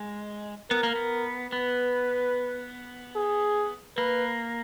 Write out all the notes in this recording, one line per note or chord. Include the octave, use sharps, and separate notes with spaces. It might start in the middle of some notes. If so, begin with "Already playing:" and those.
Already playing: G#3
B3 A#4
A#3
B3
B3 B4
G#4
A#3 B4